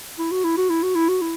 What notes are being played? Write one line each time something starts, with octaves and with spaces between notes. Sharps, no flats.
E4
F#4
E4
F#4
E4
F#4
E4
F#4
E4